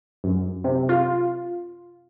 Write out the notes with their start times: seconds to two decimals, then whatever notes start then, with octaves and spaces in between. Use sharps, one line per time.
0.24 F#2
0.64 C3
0.89 F4